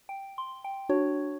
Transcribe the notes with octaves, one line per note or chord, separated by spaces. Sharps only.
G5
C6
G5
D4 F#4 C#5